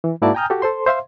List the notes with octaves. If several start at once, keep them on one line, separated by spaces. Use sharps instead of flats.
E3
G#2 A#3 E4 F#4 D5 A5
G5 G#5 A#5 D#6 F6 G6
F#4 G4 A4
A4 C5 C6
C5 E5 F5 C6